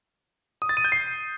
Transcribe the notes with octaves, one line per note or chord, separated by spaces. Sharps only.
D#6
A6
D#7
G6
C7